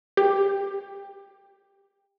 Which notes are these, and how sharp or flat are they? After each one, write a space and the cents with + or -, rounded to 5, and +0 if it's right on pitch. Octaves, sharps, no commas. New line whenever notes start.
G4 +20